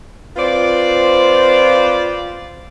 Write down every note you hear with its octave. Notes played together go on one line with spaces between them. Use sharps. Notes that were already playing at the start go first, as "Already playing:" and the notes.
C4 F4 B4 C5 D5